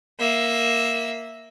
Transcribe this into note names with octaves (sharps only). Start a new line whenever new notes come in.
A#3 E5